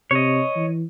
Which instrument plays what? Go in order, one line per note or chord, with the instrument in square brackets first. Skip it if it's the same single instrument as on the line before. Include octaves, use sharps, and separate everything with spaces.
[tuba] C3 [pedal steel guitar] C#5 D#5
[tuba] E3